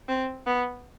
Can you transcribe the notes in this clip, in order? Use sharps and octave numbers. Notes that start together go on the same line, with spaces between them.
C4
B3